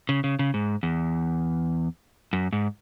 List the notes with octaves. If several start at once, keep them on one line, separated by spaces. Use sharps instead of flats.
C#3
C#3
C#3
G#2
E2
F#2
G#2